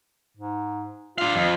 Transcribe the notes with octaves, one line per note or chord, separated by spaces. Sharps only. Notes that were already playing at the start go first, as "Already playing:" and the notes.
G#2
D4 F4 F5
F2